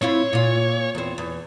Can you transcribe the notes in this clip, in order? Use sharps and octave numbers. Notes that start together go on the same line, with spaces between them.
C4 E4 F4 C#5
A#2 F4
E2 C4
E2